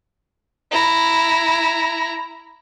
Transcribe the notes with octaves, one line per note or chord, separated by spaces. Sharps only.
E4 A#5